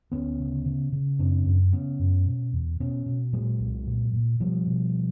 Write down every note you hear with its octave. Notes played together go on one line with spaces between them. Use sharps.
D2 B3 C#4
C#3
C#3
C#3
F#2 C4 D4
F#2
C#3 B3 C#4
F#2
B2
E2
B2 B3 C#4
B2
A#2 F#3 G#3
C2
A#2
A#2
B2 F3 G3
B2